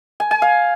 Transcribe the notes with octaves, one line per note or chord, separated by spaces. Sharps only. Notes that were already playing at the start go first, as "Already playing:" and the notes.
G#5
G#5
F5